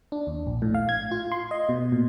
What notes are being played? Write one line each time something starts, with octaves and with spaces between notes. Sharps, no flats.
D4
D#2
A#1
A2
F5
G#6
F4
C6
D#5
B2
A#2